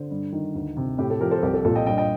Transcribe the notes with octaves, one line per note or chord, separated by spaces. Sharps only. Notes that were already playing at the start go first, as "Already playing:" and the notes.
Already playing: D3 C5
G2
D#3
D2
C3
A2 G4
A4
F3 G4 A#4
A4 C5
C2 G4 A#4
A4
A#2 A4
D#5 G5
G2 D#5 G5
D#5 G5